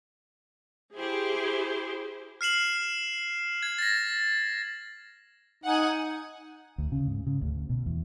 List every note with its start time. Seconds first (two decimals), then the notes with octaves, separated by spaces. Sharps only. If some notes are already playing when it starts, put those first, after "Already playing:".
0.96 E4 G4 G#4 C5
2.41 F6 C7 E7 F#7
3.63 G#6
3.79 A6 A#6
5.64 D#4 F#5 G#5
6.78 D2
6.92 C#3
7.07 G#2
7.27 C#3
7.41 D2
7.70 B2
7.86 E2